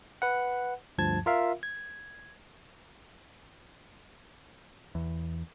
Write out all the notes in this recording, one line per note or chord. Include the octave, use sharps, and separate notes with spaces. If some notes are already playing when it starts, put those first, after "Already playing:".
B4 F#5
D2 G2 F3 A5 G#6
F4 A#4 E5 F5
G#6
E2